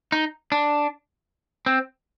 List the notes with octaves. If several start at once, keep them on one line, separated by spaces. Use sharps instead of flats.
D#4
D4
C4